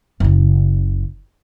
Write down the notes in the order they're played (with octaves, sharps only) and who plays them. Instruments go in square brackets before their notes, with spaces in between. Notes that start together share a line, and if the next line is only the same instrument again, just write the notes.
[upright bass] F#1 C#3